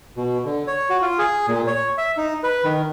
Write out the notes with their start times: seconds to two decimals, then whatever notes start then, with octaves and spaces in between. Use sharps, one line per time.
0.17 B2
0.45 D3
0.67 C#5
0.90 F#4
1.02 F4
1.19 G#4
1.48 A#2
1.67 C#5
1.98 E5
2.17 D#4
2.43 B4
2.64 D#3